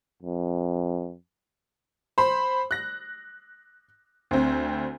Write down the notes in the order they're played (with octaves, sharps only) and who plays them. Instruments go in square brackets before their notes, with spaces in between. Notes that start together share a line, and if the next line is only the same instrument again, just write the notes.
[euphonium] F2
[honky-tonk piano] C5 B5
F#6 A#6
D2 C4